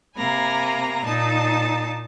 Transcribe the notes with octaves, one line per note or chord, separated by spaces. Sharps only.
C3 A#3 G#5 A#5 B5
A#2 D#4 A5